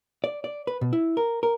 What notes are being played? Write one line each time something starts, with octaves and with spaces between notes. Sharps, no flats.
D5
D5
B4
B2
E4
A#4
A#4